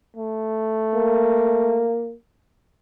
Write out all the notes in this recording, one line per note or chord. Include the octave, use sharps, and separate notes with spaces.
A3
A#3